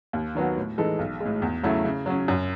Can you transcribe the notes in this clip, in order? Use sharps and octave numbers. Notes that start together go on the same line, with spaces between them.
D#2
D#3 F#3 B3 F#4
A2
E3 G#3 D#4 A4
B1
A2 G#3
E2
C#3 F#3 A3 E4
C#3
F#3 C#4
F#2